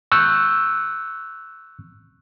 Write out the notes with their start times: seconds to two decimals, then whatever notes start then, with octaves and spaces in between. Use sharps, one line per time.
0.12 C#6 E6 F#6 G6